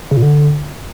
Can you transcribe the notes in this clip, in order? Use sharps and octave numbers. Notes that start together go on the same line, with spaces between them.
C#3
A#2
D3